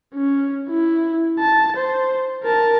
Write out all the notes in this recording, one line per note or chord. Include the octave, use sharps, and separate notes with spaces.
C#4
E4
A5
C5
A#4 A5